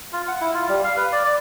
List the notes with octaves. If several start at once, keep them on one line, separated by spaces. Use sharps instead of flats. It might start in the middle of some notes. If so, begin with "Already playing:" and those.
F4
F#5
E4
F4
G3
F5
B4
D5
D5